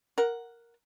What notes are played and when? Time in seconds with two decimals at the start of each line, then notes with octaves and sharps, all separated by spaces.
0.18 A#4 F#5